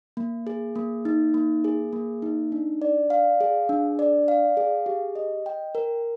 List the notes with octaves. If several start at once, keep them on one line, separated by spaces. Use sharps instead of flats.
A#3
G#4
A#3
D#4
A#3
G#4
A#3
D#4
D4
D5
F5
G#4
D4
D5
F5
G#4
G4
D#5
G5
A#4